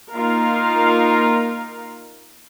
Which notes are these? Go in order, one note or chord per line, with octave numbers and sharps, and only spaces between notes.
A#3 D#4 F4 A#4 F5